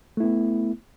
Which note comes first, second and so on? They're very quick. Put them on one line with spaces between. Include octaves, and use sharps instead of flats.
A3 E4 B3